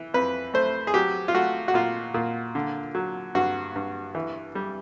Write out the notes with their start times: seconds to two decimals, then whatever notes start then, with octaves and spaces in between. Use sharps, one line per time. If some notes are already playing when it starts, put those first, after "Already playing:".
Already playing: E3
0.14 F2 B4
0.54 A3 C5
0.87 G#4
0.94 F#3 G4
1.28 F4
1.35 A3 F#4
1.68 F#4
1.74 A#2 F4
2.14 A#2
2.55 D3
2.95 F#3
3.35 G2 F#4
3.76 G2
4.15 E3
4.55 G3